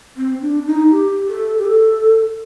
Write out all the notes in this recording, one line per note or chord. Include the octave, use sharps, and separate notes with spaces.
C4
D4
D#4
G4
A4
G4
A4